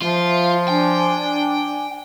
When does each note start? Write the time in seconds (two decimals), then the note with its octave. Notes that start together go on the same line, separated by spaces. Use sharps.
0.02 F3 F4 E5
0.68 D4 G5 G#5